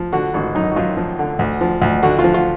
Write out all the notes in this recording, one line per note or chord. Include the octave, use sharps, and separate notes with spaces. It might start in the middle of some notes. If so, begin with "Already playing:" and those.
Already playing: F3
D3 F#4
G#1 F#4
F#2 D#4
F#4
F#2 F4
F3
D3
D2
F3
D2
D3 F#4
F4
F3
F4